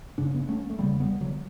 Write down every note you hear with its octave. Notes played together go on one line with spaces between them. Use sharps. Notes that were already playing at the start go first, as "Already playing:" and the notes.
F#2 C#3 D4
B3 D4
A3 C#4
A3
E2 C#3 G3 B3
G3 B3
D3 F#3